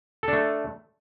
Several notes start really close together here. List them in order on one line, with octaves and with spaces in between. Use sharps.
A4 D4 A3